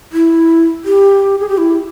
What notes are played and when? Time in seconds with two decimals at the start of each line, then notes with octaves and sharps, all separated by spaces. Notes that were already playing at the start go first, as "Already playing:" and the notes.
0.13 E4
0.85 G4
1.40 G#4
1.49 G4
1.58 E4